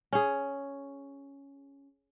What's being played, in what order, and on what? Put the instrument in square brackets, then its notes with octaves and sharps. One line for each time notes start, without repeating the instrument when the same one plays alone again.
[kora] C#4 G#4